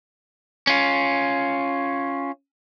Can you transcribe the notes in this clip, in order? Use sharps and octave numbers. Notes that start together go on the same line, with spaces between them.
C#4 F4